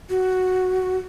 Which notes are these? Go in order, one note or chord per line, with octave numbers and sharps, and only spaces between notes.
F#4